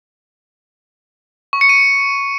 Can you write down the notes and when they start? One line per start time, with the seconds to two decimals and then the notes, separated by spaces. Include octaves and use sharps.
1.53 C#6
1.61 C#7
1.69 D#7